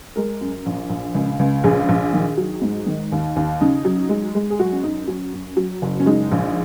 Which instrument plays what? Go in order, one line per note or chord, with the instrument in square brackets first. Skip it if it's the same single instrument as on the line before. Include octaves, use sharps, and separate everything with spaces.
[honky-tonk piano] G#3 A#4
F#2
A#1
A#1
C#2
C#2
A#1 G#4
A#1
D#3
F#3
G#2
D#3
D#2
D#2
C#3 D#4
F#3
G#3
G#3
G#4
F#3 F#4
C#4
F#2 D#4
F#3 C#4
F#2
F#3
F#1
C#4
G#3 D#4
A#1